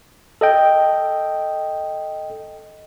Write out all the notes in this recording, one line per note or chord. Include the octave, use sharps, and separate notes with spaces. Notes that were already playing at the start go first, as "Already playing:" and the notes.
A4 D#5 G5